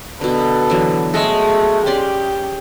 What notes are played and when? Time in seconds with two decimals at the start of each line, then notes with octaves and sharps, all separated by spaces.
0.21 B2 D3 A4 B4
0.70 D3 E3 F#3
1.14 G#3 A3 A4 D#5 E5
1.86 C#4 G4 D5 C6